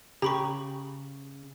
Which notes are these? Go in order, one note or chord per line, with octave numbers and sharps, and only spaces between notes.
C#3 G4 A#5 B5 C#6